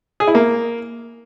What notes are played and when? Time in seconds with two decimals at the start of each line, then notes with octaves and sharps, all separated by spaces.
0.20 G#4
0.27 E4
0.35 A#3